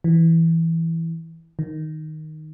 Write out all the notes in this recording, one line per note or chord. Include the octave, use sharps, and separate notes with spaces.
E3
D#3